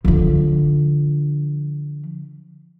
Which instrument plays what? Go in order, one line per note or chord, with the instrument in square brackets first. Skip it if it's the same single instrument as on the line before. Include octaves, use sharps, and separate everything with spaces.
[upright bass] D3 F3